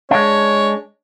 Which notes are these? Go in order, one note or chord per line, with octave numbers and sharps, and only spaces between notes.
G#3 D4 C#5